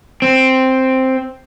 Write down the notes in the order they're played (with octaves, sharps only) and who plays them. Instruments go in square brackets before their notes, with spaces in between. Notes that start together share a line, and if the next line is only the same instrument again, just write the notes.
[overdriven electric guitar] C4